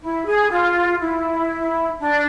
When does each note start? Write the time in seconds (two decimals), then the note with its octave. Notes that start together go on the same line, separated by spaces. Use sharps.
0.01 E4
0.26 G#4
0.50 F4
1.00 E4
1.99 D4